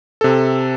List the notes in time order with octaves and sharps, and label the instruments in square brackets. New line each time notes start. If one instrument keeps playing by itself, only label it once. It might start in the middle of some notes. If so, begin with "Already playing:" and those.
[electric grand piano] C3 A4